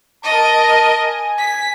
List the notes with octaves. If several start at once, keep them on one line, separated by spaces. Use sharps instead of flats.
A#4 D#5 A5
G#5
B6